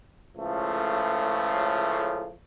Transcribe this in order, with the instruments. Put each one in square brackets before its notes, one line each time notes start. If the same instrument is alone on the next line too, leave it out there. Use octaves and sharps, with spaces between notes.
[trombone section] C#2 A2 C#3 F3 A3